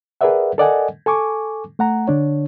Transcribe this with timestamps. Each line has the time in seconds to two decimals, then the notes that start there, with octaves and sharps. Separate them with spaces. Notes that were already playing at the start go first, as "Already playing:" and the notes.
0.21 G#4 A#4 B4 D5 E5 F#5
0.58 A4 A#4 D5 D#5 F#5 G#5
1.06 A4 G#5 C#6 D6
1.79 A3 F#5 A#5
2.08 D3 D4 C#5